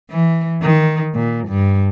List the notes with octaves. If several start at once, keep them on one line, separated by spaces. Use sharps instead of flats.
E3
D#3
A#2
G2